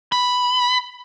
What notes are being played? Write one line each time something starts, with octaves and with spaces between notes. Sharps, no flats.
B5